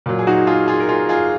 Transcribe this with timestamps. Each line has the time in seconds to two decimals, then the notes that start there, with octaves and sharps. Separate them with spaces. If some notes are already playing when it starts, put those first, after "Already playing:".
0.06 A#2 F#3
0.19 G#4
0.27 D#4 F#4
0.47 F4 G#4
0.68 F4 G#4
0.80 A#4
0.89 F4 G#4
1.09 F4 G#4